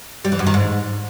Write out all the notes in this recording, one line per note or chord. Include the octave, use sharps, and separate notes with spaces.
G3
E3
F#2
D#3
G#2